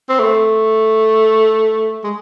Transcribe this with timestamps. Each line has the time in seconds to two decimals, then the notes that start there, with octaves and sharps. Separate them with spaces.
0.09 C4
0.19 A3
2.04 G#3